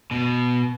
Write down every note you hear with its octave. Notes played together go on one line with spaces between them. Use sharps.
B2